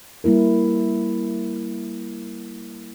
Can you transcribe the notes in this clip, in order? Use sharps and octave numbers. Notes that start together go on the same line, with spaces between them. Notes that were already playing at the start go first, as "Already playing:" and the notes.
G3 A#3 E4 A#4